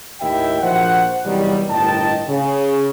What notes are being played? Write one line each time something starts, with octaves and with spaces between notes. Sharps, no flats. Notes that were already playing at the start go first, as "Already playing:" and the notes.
D#2 A2 E4 D#5 E5 G5
A#1 F3 F#4 C5 F#5
E2 C3 D#3 F#3 G3
G1 A2 D#3 D#5 G5 A5
C#3